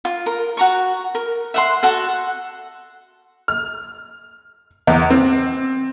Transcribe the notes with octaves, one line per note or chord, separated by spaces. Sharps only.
F4
A#4
F#4 A#5 C#6
A#4
E5 F#5 C6
F#4 A4 F#5
F6
E2
C4